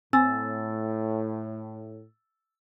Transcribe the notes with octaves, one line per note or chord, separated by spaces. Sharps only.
A2 C4 G#5 E6 A6